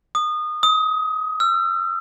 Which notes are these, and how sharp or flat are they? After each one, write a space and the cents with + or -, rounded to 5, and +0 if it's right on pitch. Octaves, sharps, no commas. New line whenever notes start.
D#6 -25
D#6 +25
E6 +45